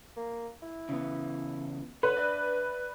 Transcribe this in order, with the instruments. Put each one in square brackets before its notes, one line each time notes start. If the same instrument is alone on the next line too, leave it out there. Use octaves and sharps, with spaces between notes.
[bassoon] A#3
E4
[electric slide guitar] C#3 E3 B3
[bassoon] D3 [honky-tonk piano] B4 [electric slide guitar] C#5
[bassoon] D4 [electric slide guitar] D5 E5